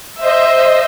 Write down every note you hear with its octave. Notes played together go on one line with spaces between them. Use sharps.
C5 D#5 E5